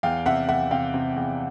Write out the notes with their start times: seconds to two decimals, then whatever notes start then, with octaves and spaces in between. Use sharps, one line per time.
0.03 E2 F5 G5
0.26 C3 E5 F#5
0.49 E2 E5 F#5
0.71 C3 F5 G5
0.94 C3
1.16 E2